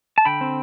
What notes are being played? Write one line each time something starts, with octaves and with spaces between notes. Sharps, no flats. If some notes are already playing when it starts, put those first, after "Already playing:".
A5
D3 G5 B5
C4